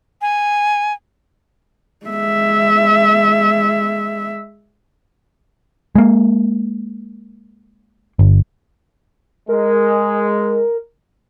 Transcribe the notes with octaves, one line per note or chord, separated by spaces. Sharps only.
G#5
G#3 E5
G#3 A#3
G1
G#3 A#4